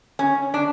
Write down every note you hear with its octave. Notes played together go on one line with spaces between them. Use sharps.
C#4
D4